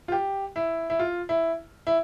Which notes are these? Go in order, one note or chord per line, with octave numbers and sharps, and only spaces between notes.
F4
G4
E4
E4
F4
E4
E4